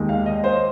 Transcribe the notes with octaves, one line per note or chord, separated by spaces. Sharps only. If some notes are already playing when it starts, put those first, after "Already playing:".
Already playing: D#2 D#3 G#3
F5
D#5
C5